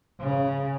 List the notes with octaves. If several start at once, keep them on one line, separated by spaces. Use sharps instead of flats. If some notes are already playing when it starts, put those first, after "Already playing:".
C#3